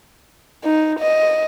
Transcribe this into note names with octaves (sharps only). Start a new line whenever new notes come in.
D#4
D#5